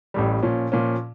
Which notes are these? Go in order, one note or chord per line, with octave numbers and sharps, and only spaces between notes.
A1 A2 G3
A#2 F3 C#4
A#2 F3 C#4